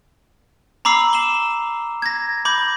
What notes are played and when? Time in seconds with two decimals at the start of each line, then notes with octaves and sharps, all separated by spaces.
0.85 A#5 B5 D6 E6 C7
1.13 E7 G7
2.02 G#6 A#6
2.45 B5 D6 G6